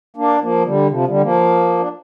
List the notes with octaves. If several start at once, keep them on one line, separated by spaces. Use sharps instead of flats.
A#3 D4
F3 A#3
D3 G3
C3 F3
D3 G3
F3 A#3
D4